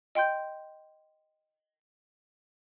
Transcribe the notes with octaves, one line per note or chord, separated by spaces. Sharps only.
D#5 G5 C6 G6